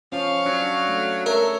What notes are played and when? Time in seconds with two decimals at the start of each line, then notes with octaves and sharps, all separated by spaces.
0.12 F3 C#4 F5 C#6
0.46 F#3 D4
0.88 A3
1.26 A4 A#4 C#5 E5